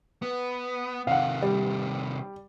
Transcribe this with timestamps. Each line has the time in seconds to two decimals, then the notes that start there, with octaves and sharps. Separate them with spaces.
0.22 B3
1.07 C3 D#3 F5 F#5
1.42 G3